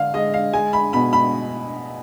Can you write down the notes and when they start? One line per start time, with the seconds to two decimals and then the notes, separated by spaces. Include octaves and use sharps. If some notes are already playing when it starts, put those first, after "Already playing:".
Already playing: D3 F5
0.14 G#3 D#5
0.34 F5
0.53 G#3 G#5
0.73 B5
0.93 B2 B5
1.13 B5